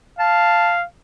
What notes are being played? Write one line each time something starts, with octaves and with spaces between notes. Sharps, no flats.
F5 A5